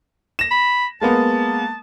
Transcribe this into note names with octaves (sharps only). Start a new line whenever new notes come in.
A#6 E7
B5
G#3 A#3 B3 A5